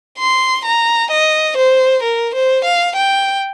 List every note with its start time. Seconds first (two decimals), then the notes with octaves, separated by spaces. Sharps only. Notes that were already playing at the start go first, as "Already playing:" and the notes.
0.19 C6
0.65 A#5
1.11 D#5
1.57 C5
2.03 A#4
2.34 C5
2.64 F5
2.96 G5